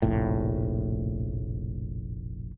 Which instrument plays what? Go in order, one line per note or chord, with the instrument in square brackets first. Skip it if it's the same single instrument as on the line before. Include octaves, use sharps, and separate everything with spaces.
[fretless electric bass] F1 A#1 A2